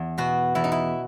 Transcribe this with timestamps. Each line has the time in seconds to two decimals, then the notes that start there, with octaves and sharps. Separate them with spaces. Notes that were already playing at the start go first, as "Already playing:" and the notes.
Already playing: E2
0.18 B2 F#4
0.55 E2 E4
0.64 D#4
0.72 E4